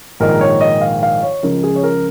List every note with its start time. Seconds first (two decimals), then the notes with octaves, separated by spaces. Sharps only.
0.20 A#1 G#2 D#3 A#4
0.41 C#5
0.61 D#5
0.81 F5
1.03 F5
1.22 C#5
1.43 C#2 C#3 F3 A#4
1.63 G#4
1.76 C#5
1.83 A#4